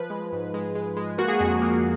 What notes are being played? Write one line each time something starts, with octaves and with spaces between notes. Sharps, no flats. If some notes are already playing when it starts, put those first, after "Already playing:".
Already playing: F3 B4
G#3
G#2
G#3
G#3
G#3
A#3 F#4
G#4
F2 F#4
A#3